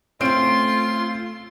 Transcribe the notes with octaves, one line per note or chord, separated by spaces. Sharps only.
A3 C4 C#4 F4 C6 D7